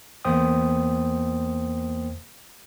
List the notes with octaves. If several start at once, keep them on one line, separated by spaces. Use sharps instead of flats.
E2 A#3 C5 G5 D#6